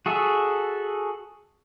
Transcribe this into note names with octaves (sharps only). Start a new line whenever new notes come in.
F#4 G#4 A4 E5